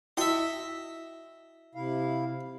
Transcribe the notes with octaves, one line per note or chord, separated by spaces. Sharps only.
E4 F#4 D#5 E5 G5
C3 E4 F5